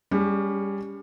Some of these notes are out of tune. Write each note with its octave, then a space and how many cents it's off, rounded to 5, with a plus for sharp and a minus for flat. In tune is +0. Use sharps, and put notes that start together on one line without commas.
G3 +20 C#4 +30 G#4 -10